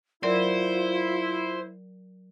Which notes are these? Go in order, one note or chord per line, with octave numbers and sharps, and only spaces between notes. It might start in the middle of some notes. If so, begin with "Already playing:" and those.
F#3 E4 F4 A#4 C5 D5